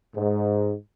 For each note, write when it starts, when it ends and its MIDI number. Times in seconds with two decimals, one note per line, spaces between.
0.16 0.73 44